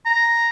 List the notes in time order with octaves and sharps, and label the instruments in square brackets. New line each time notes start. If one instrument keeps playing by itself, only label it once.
[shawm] A#5